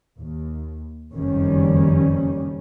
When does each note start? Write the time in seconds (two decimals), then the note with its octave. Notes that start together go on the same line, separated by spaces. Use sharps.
0.17 D#2
1.12 F#1 F2 D#3 G3 C#4